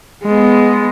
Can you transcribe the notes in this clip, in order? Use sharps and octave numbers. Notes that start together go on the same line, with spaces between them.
G#3 B3